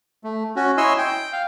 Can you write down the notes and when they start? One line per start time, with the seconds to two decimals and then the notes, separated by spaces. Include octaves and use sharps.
0.24 A3
0.56 C#4 F#4
0.77 E4 C#5 D#5 G#5 C6 E6
0.98 G5
1.33 F5